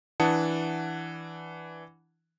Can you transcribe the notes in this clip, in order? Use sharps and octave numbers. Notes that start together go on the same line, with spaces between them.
E3 D4 F#5 A5 D#6 C#7